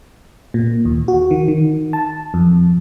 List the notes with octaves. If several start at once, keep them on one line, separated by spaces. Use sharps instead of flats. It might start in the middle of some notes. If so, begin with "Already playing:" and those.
A#2
D#2
F#4
D#3
D#3
A5
F2